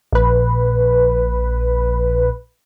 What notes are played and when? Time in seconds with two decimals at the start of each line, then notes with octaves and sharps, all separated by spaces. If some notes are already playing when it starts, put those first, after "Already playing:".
0.13 A#1 B4